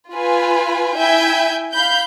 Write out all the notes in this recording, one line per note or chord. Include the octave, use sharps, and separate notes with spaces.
F4 B4 G#5
E4 E5 G5 G#5 G6 G#6
F5 B5 G6